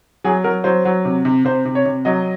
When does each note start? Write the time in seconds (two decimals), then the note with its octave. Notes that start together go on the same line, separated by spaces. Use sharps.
0.24 F#3 G#4
0.44 F#3 A#4
0.64 F#3 C5
0.85 F#3
1.05 C3
1.25 C3
1.45 C3 C5
1.65 C3
1.75 C#5
1.85 C3
2.05 F#3 D#5